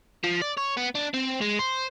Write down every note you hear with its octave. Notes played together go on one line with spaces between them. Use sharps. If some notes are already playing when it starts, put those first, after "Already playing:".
F3
D5
C#5
B3
D4
C4
G#3
C5